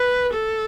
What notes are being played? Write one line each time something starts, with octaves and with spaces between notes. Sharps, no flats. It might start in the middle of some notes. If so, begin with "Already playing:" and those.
Already playing: B4
A4